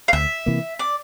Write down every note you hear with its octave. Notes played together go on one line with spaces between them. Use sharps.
F5
D2 E5
C3 E3 A#3
D5